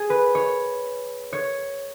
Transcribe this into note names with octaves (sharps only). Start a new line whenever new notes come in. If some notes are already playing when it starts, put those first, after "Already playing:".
Already playing: G#4
B4
C#5
C#5